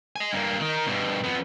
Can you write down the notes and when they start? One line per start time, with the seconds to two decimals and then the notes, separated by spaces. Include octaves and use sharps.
0.16 D#5 G#5
0.33 G2 A#3
0.60 D#3 D#4
0.87 G2 B2
1.24 F2 B3